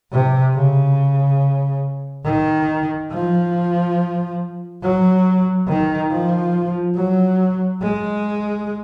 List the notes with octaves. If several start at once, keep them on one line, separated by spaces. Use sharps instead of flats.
C3
C#3
D#3
F3
F#3
D#3
F3
F#3
G#3